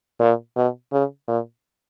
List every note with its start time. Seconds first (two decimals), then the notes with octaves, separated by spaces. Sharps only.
0.20 A#2
0.56 B2
0.92 C#3
1.28 A#2